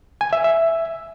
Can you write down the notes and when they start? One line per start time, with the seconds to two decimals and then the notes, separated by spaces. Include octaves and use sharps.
0.21 G#5
0.33 E5
0.44 E5